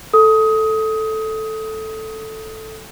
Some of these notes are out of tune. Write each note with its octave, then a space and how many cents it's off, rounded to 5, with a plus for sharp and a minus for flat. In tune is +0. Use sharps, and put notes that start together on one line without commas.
A4 +0 D#6 +20